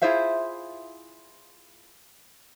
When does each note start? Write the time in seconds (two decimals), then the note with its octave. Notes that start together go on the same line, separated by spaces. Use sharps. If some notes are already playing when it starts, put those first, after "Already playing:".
0.02 E4 F4 G#4 C5 E5 F5